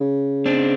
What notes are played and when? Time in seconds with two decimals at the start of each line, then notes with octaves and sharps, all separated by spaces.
0.01 C#3
0.46 C4 D4